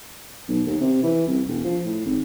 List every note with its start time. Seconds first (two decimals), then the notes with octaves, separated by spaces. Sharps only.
0.48 B1
0.66 D#2
0.81 C3
1.03 E3
1.28 C2
1.48 E1
1.64 F3
1.85 A2
2.06 G#1